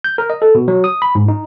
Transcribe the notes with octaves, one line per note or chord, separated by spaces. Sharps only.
G6
A#4
D#5
A4
B2
F#3
D#6
B5
G#2
D#4